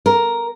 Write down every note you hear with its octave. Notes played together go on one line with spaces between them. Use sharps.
A#4